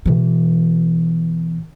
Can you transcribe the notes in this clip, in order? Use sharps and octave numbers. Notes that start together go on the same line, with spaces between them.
B2 E3